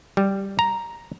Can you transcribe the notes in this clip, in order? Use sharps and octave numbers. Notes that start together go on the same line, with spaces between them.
G3
A#5